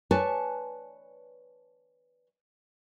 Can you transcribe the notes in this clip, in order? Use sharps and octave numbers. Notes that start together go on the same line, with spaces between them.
B4 C#5 D5 G#5 A5